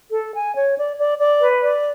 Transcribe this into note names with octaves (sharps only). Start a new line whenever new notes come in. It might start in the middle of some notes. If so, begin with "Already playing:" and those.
A4
G#5
C#5
D5
D5
D5
B4
D5